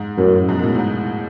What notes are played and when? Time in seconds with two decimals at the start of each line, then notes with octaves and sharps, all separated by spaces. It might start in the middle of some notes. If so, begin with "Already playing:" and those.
Already playing: G#2
0.18 F#2 A2
0.49 G#2 B2
0.59 G#2
0.63 A2
0.75 A2
0.79 G#2